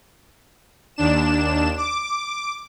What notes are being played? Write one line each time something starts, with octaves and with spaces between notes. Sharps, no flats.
D#2 D4 E7
D6